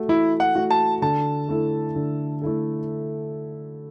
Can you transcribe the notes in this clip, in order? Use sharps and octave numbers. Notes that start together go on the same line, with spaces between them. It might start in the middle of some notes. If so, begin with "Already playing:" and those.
Already playing: A3 F#4
E3 E4
F#5
A3 F#4
A5
D3 A5
A3 E4 A4
D3
A3 E4 A4